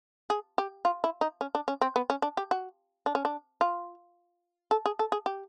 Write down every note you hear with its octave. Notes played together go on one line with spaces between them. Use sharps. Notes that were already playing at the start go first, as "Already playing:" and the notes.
G#4
G4
F4
E4
D#4
C#4
D4
C#4
C4
B3
C#4
D4
G4
F#4
D4
C#4
D4
F4
A4
G#4
A4
G#4
G4